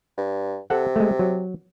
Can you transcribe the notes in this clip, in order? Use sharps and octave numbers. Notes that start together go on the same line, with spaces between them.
G2
C3 A4 F#5
G#3 A3
F#3